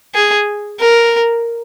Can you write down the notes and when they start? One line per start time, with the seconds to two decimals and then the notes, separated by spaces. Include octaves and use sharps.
0.15 G#4
0.80 A#4